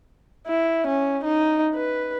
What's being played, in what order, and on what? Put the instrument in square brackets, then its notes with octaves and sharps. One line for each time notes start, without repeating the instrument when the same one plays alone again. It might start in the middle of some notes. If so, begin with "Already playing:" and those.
[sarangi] E4
C#4
D#4
B4